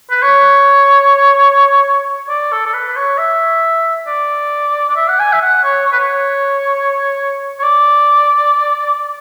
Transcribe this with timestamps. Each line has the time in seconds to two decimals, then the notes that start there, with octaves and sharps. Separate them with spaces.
0.11 B4
0.23 C#5
2.29 D5
2.52 A4
2.66 A4
2.74 B4
2.88 B4
2.96 C#5
3.18 E5
4.07 D5
4.89 D5
4.96 E5
5.08 F#5
5.20 G#5
5.32 E5
5.41 F#5
5.64 C#5
5.86 C#5
5.92 B4
5.99 C#5
7.59 C#5
7.63 D5